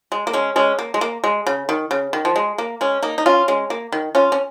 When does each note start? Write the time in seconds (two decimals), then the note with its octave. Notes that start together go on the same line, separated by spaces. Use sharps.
0.12 G#3
0.27 A#3
0.33 G#3 C#4
0.56 G#3 C#4
0.79 A#3
0.94 G#3
1.01 A#3
1.24 G#3
1.47 C#3
1.69 D#3
1.91 C#3
2.13 D#3
2.25 F3
2.36 G#3
2.58 A#3
2.81 G#3 C#4
3.03 A#3 D#4
3.18 D#4
3.26 C#4 F4
3.48 G#3 C#4
3.70 A#3
3.92 D#3
4.15 C#4 F4
4.32 C#4